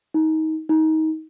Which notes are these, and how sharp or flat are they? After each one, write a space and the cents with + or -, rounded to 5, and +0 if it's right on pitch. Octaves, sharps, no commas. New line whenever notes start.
D#4 +25
D#4 +25